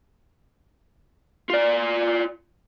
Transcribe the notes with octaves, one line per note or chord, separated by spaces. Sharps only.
F4 D5